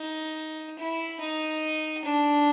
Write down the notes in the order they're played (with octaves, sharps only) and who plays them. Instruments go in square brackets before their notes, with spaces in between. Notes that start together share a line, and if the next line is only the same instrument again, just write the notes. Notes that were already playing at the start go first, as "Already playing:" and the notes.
Already playing: [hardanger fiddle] D#4
E4
D#4
D4